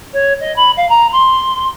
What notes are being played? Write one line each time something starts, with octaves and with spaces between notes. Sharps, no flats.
C#5
D#5
B5
F5
A#5
C6